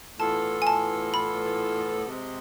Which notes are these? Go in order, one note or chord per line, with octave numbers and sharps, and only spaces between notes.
A2 E3 B3 F4 A4 A5
G#5
A5
B5
C3 G#3 C4